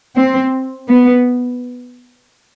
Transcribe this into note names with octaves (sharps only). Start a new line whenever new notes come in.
C4
B3